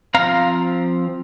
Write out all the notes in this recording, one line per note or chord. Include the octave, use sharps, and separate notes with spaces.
F3 C4 F5 A#5